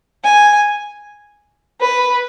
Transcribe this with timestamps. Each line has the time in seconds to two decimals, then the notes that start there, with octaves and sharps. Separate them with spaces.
0.24 G#5
1.81 B4